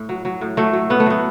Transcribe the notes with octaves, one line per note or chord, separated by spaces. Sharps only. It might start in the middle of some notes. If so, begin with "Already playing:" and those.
Already playing: A2
F#3
F#3
A2
F#3 A3
F#3
A2 B3
A3
F#3 B3